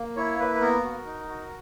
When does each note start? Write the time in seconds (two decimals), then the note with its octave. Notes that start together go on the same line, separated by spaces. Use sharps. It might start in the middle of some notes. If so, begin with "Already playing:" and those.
Already playing: A#3
0.16 E4 C#5
0.39 A#3 B4
0.55 B4
0.61 B3 A#4
0.84 F#4
1.06 D#4
1.28 F#4